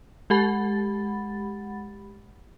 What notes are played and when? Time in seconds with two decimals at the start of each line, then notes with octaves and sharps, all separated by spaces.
0.30 G#3 G4 F#5 B5 A6